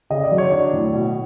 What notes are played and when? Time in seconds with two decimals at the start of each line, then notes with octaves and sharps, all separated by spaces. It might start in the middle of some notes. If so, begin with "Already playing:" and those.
0.10 C#3 D#5
0.24 D5
0.31 F#3
0.38 C#5
0.52 D4
0.73 A2
0.94 B2